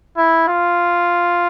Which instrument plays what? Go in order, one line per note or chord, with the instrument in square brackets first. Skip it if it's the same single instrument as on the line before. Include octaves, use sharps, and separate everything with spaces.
[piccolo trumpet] E4
F4